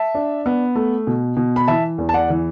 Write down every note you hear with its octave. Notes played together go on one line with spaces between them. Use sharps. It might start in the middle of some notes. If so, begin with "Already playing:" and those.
Already playing: E5 A5
D4
B3
A3
B2
B2
B5
E3 E5 A5
E2
A5
D5 F#5
E3